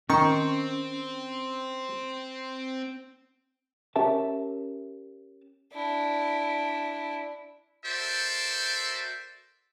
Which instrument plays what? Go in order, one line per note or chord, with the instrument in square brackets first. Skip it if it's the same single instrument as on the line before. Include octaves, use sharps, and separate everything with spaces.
[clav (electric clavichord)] D#3 [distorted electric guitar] C4 [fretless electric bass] C#4 [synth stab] C#6
[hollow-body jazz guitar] C#4 G4 A#4 E5 A5
[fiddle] D4 E4
[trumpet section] F#4 A4 A#4 C5 D5 E5